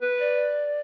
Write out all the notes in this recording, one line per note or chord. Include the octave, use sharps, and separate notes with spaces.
B4
D5